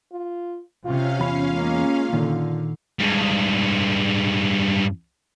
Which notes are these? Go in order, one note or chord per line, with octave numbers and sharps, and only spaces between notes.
F4
C3 C#4 F4 F5
E2 F4 B5
G#3 A#3
A#2 D3 D#3
G2 G#3